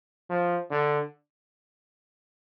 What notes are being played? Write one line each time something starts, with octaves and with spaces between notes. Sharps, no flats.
F3
D3